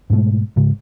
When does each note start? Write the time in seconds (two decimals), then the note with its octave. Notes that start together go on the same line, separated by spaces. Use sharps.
0.10 G#2 B2 G#3 A3
0.56 G#2 C#3 G#3